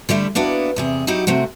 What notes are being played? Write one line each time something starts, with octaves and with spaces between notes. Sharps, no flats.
D3 G3 A3 E4
A#3 B3 D4 E4 F#4
E2 C3 G#4
F#3 D#4 E4 F#4 G4
C3 A3 C4 F#4